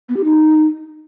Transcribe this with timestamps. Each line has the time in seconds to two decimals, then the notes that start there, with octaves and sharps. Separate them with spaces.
0.09 B3
0.17 G4
0.24 D#4